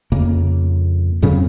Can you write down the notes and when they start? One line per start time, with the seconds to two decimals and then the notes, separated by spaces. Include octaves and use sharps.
0.12 F2 C#3 A#3
1.22 F2 C#3 F#3 C4